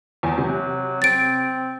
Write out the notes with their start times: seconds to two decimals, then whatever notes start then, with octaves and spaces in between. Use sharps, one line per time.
0.23 E2 G#5
0.38 C3 F#3
1.02 C4 A6 D7